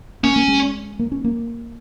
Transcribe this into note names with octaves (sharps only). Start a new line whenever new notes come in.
A#3 C#4
A#3
G#3
A#3
C#4
A#3